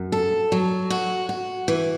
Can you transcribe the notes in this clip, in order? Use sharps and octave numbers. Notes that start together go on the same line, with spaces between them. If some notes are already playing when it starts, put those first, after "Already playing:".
Already playing: F#2
A4
F#3
F#4
F#4
E3